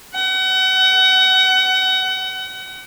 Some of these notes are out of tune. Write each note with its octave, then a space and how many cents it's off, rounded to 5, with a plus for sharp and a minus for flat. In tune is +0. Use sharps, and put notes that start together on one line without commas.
F#5 +30